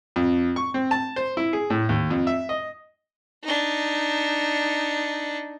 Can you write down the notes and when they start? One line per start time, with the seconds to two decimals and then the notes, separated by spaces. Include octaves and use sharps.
0.16 F2
0.56 C#6
0.74 C4
0.91 A5
1.16 C5
1.37 E4
1.53 G#4
1.70 A2
1.89 D#2
2.10 F2
2.27 E5
2.49 D#5
3.43 D4 D#4